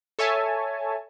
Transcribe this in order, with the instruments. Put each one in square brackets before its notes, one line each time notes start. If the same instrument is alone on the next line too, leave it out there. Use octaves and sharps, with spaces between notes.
[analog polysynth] A4 C#5 E5 G#5 A5